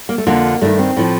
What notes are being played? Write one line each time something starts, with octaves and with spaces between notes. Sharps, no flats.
A#3
A3
F2 D3 F3 A#3
G2 D#3 A3
C4
A2 F3